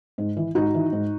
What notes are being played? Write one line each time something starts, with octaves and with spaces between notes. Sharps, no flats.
G#2
E3
G#2 D#4 F#4
E3
G#2